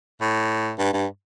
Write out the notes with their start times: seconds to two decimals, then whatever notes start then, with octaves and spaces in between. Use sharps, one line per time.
0.21 A2
0.78 G2
0.93 G2